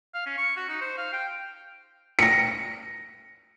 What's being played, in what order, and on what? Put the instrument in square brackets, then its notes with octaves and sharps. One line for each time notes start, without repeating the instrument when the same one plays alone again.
[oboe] F5
C#4
C#6
F#4
D#4
C5
F5
G5
[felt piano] A#6 C#7